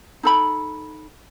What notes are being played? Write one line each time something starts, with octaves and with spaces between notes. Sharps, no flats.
D#4 A4 B5